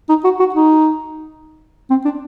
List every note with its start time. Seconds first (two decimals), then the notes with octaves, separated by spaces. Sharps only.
0.09 D#4
0.24 F#4
0.40 F#4
0.54 D#4
1.90 C4
2.05 D4